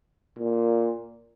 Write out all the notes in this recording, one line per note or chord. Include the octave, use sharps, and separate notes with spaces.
A#2